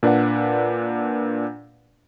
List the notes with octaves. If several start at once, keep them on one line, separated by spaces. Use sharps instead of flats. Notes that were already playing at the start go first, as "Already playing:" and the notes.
A#2 D4 B4 D5 F#5